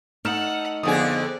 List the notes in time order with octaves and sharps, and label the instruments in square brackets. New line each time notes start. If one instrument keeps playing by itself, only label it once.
[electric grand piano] A3 F6 E7 [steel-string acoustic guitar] D#4 A4 [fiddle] F#5
[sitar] F2 D3 G#4 [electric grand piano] B3 D#6 [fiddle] D5